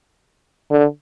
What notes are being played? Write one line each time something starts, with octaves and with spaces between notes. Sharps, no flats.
D3